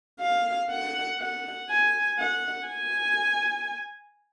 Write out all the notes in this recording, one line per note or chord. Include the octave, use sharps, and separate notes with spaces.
F5
F#5
F#5
G#5
F#5
G#5